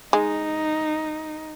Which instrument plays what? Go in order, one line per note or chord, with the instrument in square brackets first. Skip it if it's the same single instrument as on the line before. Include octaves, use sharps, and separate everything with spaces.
[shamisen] G#3 [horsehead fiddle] D#4